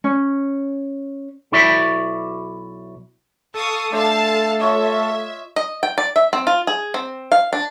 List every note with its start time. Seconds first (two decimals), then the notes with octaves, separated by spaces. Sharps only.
0.04 C#4
1.52 B1 E4 F#4 D5 E5 B5
3.54 A4 F5 C#6 D#6
3.92 A3 D4 C5 F5 A5
4.60 F4 C#5 D#5 E5
5.56 D#5
5.83 G5
5.98 D5
6.16 E5
6.33 C4
6.47 F4
6.67 G#4
6.94 C4
7.32 F5
7.53 D4